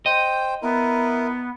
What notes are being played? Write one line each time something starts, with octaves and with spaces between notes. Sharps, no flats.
C5 D#5 G5
B3 E4 A#4